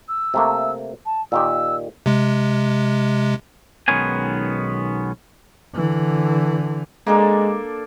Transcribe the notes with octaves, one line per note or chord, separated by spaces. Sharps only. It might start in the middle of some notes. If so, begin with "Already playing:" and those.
E6
C3 A3 A#3
A5
A#2 D#3 G4 E6
C3 G#3
B1 D#3 G#3 B3 C#4 G#5
D3 E3
G#3 A#3 D4 A4